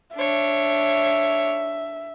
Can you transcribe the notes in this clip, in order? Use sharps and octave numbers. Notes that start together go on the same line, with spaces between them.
D4 C#5 E5